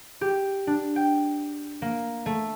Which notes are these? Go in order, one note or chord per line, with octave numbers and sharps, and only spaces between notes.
G4
D4
G5
A#3
A3